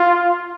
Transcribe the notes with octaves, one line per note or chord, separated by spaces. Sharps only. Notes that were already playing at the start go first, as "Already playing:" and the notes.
Already playing: F4